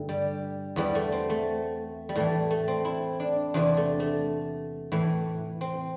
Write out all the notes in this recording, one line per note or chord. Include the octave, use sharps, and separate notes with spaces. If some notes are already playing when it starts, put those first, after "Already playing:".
Already playing: G2 D3 A3
G3
E2 E3 G3
A3
C4
A3
G3
A2 E3 A3
A3
C4
E4
D4
E2 C3 E3 D4
A3
A3
A2 E3
C4